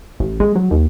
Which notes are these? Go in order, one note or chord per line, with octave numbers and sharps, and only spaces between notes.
A1
G#3
F#3
D#2